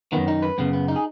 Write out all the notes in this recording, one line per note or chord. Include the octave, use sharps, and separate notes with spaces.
F#2 D#3 B3
D#4
B4
F#2 C#3 B3
B3
D#4
G#4